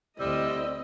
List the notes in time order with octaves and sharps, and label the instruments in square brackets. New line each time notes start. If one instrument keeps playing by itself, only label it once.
[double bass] D2 [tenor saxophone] G3 [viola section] C4 E4 D#5 [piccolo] E6